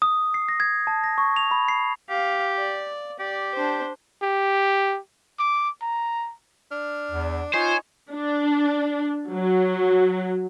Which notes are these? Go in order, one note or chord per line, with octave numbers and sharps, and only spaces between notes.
D#6
C7
A#6
G#6
A5
A#6
C#6
F7
B5
C7
G4 F5
D5
G4 D5
D4 C5
G4
D6
A#5
D4 F6
E2
D#4 F4 C5 C#5 G#5
D4
F#3